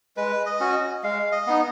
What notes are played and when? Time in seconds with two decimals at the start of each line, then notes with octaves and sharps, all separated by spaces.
0.17 G#3 B4
0.46 D#5
0.60 C#4 F#4
1.03 G#3 F5
1.32 D#5
1.47 B3 D#4